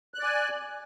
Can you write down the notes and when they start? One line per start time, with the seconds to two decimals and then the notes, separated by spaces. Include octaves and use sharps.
0.14 F#6
0.19 D5
0.24 G#5